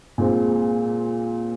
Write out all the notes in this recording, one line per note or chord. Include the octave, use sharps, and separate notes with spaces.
A#2 G#3 C4